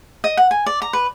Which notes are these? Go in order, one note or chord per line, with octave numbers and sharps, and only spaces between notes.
D#5
F#5
G#5
D5
A#5
B4